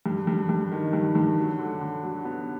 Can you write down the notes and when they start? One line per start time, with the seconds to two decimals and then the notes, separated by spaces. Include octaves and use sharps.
0.06 G2
0.27 G2
0.49 G2
0.72 D#3
0.93 G2
1.15 G2
1.38 F#3
1.59 D3
1.81 D3
2.03 F#3
2.25 B3